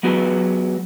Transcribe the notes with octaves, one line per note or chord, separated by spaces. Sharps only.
F#3 G#3 B3 F#4 B4